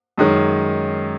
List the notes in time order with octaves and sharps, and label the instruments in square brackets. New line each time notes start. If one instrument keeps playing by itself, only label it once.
[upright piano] F#2 D#3 G#3 C#4